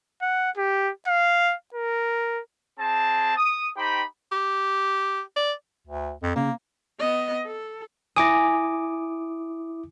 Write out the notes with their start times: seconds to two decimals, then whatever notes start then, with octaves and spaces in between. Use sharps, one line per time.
0.22 F#5
0.58 G4
1.07 F5
1.74 A#4
2.78 C4 G#4 A5
3.36 D#6
3.76 D#4 G4 C5 G5 B5
4.32 G4
5.36 D5
5.87 D2
6.23 F2
6.36 C#3 A#3
7.00 B3 D#5
7.46 A4
8.16 E4 G#5 D6 D#6 A#6